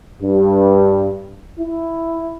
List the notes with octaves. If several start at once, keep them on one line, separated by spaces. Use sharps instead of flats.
G2
E4